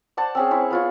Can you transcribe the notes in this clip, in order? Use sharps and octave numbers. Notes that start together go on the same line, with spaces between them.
C5 D5 F#5 A5
C4 C#4 G#4
E4 C5 C#6
B3 F4 C#5